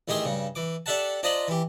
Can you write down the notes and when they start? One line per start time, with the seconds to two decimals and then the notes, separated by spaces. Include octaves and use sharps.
0.08 A1 D#3 A3 G4 G#4 C6
0.25 G2 C#3
0.55 E3 D6
0.86 D4 G4 A4 E5 F#5 A5
1.23 D4 F4 C5 D#5 A#5 B5
1.48 E3 G4